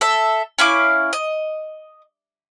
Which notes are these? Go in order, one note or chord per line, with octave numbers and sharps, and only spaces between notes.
A4 E5
C#4 E4 F5 D6
D#5